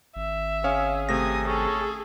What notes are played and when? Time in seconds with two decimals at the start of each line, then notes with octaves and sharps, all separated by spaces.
0.16 G#1 E5
0.64 C#4 G#4 C#5 F5
1.09 C3 A3 G#5 D#6 A#6
1.47 C#4 G#4 A4